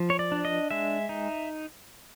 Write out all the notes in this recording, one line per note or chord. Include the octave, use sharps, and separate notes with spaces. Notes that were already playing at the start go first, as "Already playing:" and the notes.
Already playing: F3
C#5
D5
D4
D#5
G#3 E5
D#4